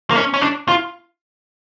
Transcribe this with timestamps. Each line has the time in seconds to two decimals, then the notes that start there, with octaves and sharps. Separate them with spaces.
0.11 A#3
0.16 C#4
0.34 C#4
0.41 D4
0.68 F4